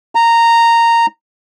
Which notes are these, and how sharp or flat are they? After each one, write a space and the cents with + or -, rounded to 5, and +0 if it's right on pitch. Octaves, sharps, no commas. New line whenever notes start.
A#5 -10